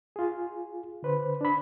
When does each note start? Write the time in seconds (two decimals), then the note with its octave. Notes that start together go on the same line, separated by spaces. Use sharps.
0.16 F4 G#4
1.03 D3 B4 C5
1.41 D4 B5